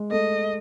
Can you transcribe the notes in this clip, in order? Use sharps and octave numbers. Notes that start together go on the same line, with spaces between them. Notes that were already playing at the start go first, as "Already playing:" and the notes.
Already playing: G#3
A3 D#5